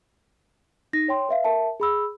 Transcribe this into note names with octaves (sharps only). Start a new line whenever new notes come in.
D#4 A#6
C#5 G5 C6
B4 E5 F5
A#4 E5 A5
G#4 B5 E6